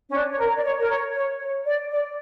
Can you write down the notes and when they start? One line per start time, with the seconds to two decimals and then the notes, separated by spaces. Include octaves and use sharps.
0.09 C#4
0.12 D4
0.30 C#5
0.38 A#4
0.56 D5
0.63 C#5
0.79 A#4
0.89 C#5
1.14 C#5
1.40 C#5
1.65 D5
1.90 D5